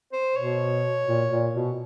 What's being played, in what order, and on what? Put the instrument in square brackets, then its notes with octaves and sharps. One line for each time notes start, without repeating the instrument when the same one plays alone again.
[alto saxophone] C5
[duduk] B2 [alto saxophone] C#5
[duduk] A#2
A#2
B2